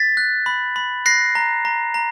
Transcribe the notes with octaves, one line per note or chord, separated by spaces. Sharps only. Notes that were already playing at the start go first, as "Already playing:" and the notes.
Already playing: A6 B6
F#6
B5
B5
F#6 A#6 C7
A#5
A#5
A#5